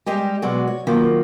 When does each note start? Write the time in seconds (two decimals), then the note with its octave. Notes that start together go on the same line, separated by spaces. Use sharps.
0.06 G3 G#3 G4 D#5
0.42 B2 F#3 G#3 F#4 D5
0.67 C#5
0.87 F#2 D#3 F3 F#3 A#3